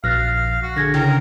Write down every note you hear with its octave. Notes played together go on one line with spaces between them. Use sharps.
A#1 F5 F6 F#6 A6 A#6
F#4
D3 G#4 G#6 A#6
C#3 E4 A#4 G5